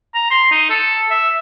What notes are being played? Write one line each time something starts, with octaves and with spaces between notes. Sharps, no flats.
A#5
C6
D#4
A4
E5